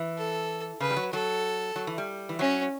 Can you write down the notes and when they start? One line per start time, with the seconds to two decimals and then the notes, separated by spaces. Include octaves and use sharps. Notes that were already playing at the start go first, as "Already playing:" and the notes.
Already playing: E3
0.17 A4
0.80 C#3 B4
0.91 G3
0.96 F#3
1.12 F#3 A4
1.76 F#3
1.87 E3
1.98 G3
2.29 E3
2.39 F#3 C#4